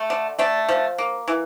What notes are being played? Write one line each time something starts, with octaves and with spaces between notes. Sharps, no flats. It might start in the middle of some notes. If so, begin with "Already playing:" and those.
Already playing: A3
D3
A3 D4
F3
A#3
E3